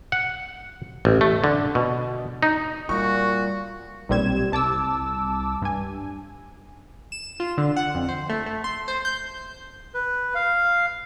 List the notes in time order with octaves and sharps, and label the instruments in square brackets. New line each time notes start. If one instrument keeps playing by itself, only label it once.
[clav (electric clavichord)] F#5
A1
A3
D3
B2
D#4
[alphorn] A#2 [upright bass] G3 [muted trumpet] F#4 [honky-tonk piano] C#6
[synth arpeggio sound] B1 A#2 G3 C4 G#6 E7
C2 A5 D6 E6
G2 G#5
[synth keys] E7
F4
D3
F#5
F2
C5
A3
A3
C6
C5
G6
[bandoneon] B4
F5